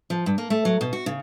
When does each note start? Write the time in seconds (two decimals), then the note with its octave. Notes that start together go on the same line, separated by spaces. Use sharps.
0.10 F3
0.26 G2
0.38 A#3
0.50 A3
0.65 F#3
0.81 B2
0.93 F#4
1.06 C#3